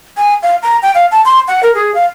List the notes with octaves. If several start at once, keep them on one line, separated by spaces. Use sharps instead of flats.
G#5
F5
A#5
G5
F5
A5
C6
F#5
A#4
G#4
F5